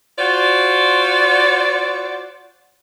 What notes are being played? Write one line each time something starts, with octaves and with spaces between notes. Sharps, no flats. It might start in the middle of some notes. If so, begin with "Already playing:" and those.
F4 F#4 C5 D5